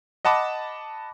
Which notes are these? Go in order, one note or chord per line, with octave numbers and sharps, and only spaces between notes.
D#5 F#5 A5 B5 D6